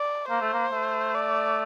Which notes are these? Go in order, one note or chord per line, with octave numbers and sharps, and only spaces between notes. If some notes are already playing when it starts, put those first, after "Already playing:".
Already playing: D5
A#3 C5
A3
A#3
A3
D5